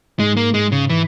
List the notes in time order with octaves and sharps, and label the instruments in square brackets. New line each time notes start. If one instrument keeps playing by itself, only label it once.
[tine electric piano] G#2 [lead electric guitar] G#3
[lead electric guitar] A#3
G#3
C#3
E3